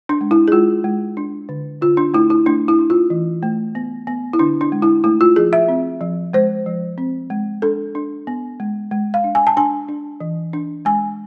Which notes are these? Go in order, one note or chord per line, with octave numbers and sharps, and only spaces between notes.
D4
G#3
E4
G#4
G#3 F4
G#3
D4
D3
D3 F4
D4
A3 E4
E4
A3 D4
E4
D4
F4
E3
A3
B3
B3
E4
D3 D4
D4
G#3
E4
A3 E4
F4
F3 G#4
E5
C4
F3
G#3 C5
F3
C4
G#3
D4 A4
D4
B3
G#3
G#3
F5
D4
G#5
A5
D4 G#5
D4
E3
D4
G#3 G#5